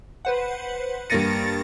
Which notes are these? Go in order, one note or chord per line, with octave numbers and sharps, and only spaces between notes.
B4 C5 F#5
G2 A#3 A6 A#6 C#7 D#7